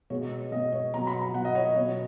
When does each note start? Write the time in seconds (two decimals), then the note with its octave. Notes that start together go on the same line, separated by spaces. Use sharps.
0.10 B2 G#3 C#5
0.52 B2 D#5
0.55 G#3
0.72 C#5
0.94 B2 F#3 A#5
1.07 B5
1.21 A#5
1.34 B2 F#3 F#5
1.45 D#5
1.55 C#5
1.65 D#5
1.76 B2 C#5
1.81 F#3